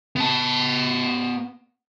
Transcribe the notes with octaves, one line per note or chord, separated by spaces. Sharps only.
B3 A5